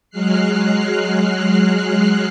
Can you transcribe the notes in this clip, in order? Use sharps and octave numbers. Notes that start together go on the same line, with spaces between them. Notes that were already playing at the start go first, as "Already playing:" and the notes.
F#3 G#3 F6 F#6 C7